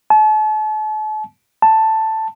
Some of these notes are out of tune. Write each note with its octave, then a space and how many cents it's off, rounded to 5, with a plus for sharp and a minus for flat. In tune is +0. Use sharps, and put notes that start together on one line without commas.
A5 -40
A5 +5